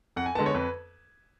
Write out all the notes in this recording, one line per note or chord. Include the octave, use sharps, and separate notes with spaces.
F2 F#5
G#5
D3 G#3 B3 A5
C#5
F2 B4